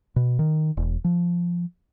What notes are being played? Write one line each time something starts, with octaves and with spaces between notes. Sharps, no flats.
B2
D#3
E1
F3